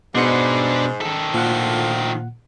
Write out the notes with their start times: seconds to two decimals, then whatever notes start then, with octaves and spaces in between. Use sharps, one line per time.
0.15 G#2 B2 D4 B4 C6 C#7
1.01 D#3 A4
1.34 D2 A#2 F3 F5 F#5